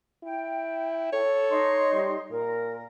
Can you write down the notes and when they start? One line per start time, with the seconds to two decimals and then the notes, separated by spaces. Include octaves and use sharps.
0.24 E4 G5
1.13 A4 C#5
1.51 D#4 C6
1.93 G3
2.31 A#2 A#4